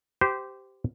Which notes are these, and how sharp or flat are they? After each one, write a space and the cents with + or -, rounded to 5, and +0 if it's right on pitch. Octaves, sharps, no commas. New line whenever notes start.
G4 -10 C5 -20